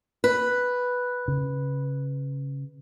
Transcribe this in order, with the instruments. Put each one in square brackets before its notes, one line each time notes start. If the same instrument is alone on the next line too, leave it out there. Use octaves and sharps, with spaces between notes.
[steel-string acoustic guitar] B4
[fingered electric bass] C#3